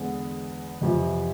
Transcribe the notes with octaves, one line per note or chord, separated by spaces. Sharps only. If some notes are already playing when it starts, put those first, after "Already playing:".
Already playing: E2 D3 G#3 B3
F2 C3 E3